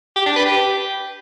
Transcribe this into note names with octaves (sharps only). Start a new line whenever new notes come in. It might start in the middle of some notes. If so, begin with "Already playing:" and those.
G4
D4
B4
G4